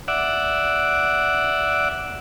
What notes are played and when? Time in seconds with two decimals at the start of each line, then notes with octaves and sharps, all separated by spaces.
0.08 D5 E5 F#5